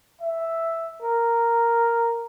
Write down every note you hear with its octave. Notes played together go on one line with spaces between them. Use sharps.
E5
A#4